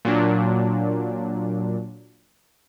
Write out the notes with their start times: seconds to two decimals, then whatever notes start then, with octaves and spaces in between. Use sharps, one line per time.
0.05 A#2 F#3 D4